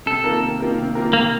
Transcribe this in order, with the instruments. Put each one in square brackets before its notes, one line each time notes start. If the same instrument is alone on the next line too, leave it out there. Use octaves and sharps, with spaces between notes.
[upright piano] C3 [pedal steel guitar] A4
[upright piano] D#3 A#3 F4 A#4
C3
D#3 A#3 F4 A#4
C3
D#3 A#3 F4 A#4
[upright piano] C3 [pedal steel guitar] A#3